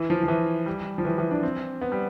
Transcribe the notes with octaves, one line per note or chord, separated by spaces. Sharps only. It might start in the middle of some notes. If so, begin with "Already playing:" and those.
Already playing: E3
F3
F3
E3
G3
F3
E3
E3
D4
C4
B3
G3